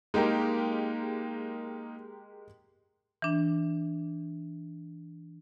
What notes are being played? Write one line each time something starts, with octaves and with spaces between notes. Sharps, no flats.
G#3 A#3 D#4 G4 A#4
E3 D4